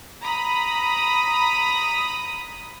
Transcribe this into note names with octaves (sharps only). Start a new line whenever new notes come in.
A#5 B5 D#6